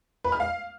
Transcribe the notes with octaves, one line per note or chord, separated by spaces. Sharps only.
B4
F6
F5